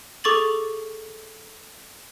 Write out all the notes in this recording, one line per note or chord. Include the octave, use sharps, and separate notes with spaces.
G#4 A4 C#6 D6 A6 F#7